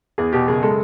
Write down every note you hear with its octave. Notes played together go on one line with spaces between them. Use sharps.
E2 G#4
B2 G4
F#1 G#4
G#3 A4